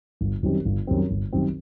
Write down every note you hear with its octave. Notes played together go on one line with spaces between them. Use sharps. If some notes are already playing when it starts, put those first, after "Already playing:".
G1
F#2 D#3 G3 C4
G1
F#2 D#3 G3 C4
G1
F#2 D#3 G3 C4